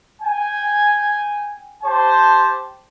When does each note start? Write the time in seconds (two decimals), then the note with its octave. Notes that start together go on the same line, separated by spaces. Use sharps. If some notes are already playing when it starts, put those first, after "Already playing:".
0.22 G5 G#5
1.83 G4 C5 A5